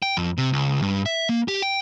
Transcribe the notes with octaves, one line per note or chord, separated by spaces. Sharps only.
G5
F2
C3
C#2
G2
E5
A#3
G4
G5